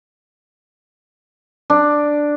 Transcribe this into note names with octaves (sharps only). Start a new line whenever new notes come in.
D4